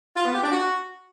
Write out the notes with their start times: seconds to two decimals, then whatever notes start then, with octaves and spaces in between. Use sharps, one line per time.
0.16 F4
0.25 B3
0.34 G4
0.43 D4
0.52 F#4